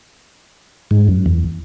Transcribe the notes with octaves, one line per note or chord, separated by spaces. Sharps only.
G#2
F#2
E2